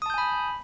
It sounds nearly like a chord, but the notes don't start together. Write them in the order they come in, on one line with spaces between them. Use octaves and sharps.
D#6 A5 G6 G#5 B5